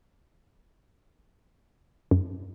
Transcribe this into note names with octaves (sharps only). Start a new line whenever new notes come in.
F#2